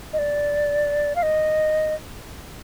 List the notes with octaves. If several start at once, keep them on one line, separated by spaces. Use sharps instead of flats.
D#5
D5
F5
D#5